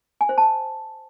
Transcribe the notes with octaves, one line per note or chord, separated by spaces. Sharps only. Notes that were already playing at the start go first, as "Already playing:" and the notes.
G#5
C5
A5